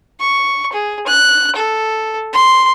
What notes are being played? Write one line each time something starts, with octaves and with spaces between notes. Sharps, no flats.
C#6
G#4
F#6
A4
C6